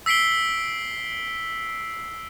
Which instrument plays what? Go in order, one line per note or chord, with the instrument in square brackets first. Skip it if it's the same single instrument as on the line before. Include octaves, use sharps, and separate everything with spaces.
[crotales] E6 B6 C7 D7 G7